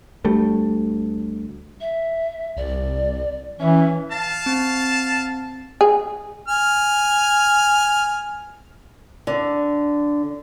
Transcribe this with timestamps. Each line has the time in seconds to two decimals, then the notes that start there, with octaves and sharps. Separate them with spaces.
0.25 D2 G3 A3
1.80 E5
2.57 C2 D5
3.60 E3 C#4 E5
4.11 F5 A5
4.46 C4
5.81 G#4
6.48 G#5 F6
9.27 D3